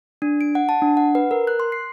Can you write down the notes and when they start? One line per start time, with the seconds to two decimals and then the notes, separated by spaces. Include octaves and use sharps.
0.22 D4
0.41 D7
0.55 F#5
0.69 A5
0.82 D4
0.97 F#5
1.15 B4
1.31 A#4
1.47 F#6
1.60 C6
1.72 C7